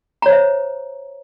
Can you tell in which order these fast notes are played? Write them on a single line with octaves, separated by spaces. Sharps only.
A#5 C#5 C5 E5